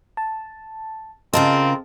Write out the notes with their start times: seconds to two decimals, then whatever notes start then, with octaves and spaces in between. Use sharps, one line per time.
0.17 A5
1.33 C#3 C4 F4 A#4 D#5 F5 A5